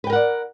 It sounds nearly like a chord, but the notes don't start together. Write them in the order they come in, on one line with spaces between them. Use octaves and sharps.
B4 G5 A#4 F#5 D5